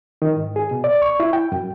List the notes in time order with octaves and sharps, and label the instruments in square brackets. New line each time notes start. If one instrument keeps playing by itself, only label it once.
[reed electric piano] D#3
G#2
G#4
B2
D5
C#6
E4
G5
F#2